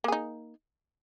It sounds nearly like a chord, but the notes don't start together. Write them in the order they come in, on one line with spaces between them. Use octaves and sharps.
A#3 G#4 D#4